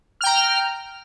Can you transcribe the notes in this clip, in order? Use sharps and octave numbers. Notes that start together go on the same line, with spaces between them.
G5 A#5 F6